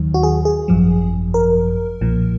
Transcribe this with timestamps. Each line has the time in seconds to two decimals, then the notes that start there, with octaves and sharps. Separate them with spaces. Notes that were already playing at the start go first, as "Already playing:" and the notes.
Already playing: D#2 D#3 F#3
0.14 F#4
0.23 G#4
0.45 G#4
0.68 G#1 F#2 F3
1.34 A#4
2.01 B1 A#2 F3